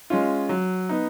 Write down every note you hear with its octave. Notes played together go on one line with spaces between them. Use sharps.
G#3 C#4 F4
F#3
B3 D#4